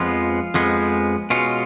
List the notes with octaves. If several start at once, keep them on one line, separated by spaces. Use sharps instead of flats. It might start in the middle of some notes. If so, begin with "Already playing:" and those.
Already playing: F2 F3 G#3 B3 F4
F2 F3 G#3 B3
B2 G#3 C#4 F4